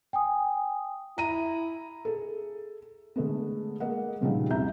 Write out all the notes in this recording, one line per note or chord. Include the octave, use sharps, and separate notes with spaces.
G5 G#5 D#6
E4 A#5 D#7
G#4 A4
D3 G#3 A3 B3
G#3 A#3 A#4 D#5 F#5
G2 A#2 C#3 F3 G3 D#4
C2 F2 E4 E5 A#5 G6